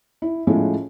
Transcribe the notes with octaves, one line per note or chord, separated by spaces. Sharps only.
E4
A2 F3 G#3 C#4 E4